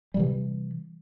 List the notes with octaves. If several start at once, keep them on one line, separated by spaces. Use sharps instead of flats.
C3 E3 G3